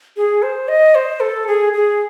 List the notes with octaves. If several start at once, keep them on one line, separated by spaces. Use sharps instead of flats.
G#4
C5
D#5
C5
A4
G#4
G#4